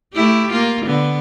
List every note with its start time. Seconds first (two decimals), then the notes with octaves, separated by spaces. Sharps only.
0.14 A3 E4 G4
0.52 A#3 F4
0.86 D3 B3